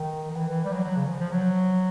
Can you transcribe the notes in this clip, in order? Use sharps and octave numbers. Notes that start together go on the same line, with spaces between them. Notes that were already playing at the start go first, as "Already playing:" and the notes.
Already playing: D#3
D#3
E3
E3
G3
F#3
F#3
C#3
F3
F3
F#3